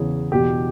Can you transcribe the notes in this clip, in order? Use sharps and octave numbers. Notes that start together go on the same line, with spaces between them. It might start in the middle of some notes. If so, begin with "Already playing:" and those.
Already playing: E2 C#3 E3 G#4
E2 B2 G4